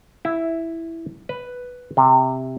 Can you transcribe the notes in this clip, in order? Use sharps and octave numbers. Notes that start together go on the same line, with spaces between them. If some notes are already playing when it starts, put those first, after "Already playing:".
E4
B4
C3